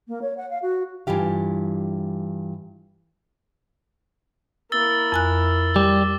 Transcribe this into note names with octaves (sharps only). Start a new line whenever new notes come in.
A#3
C#5
F#5
F5
F#4
G2 E3 F4 G4 F5
A#3 E4 E6 A6 G7
F2 G#5 F#6
G3 D6